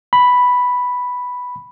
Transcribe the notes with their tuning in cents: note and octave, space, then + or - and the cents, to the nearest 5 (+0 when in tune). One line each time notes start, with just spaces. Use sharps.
B5 +0